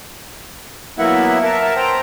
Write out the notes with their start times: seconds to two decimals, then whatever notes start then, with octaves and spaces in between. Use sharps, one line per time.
0.99 F#3 A#3 B3 E4 E5 F#5
1.43 A#4 E5 A5
1.76 C5 G5 A#5